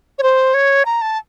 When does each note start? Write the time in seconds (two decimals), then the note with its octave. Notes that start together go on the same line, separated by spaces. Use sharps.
0.19 C#5
0.23 C5
0.54 C#5
0.85 A#5
1.02 A5